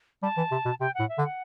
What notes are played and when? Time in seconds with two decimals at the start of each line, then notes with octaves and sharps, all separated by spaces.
0.23 G3 A5
0.37 E3
0.51 C3
0.66 B2
0.80 C3 G5
0.95 A2 F#5
1.09 E5
1.18 D3
1.24 F#5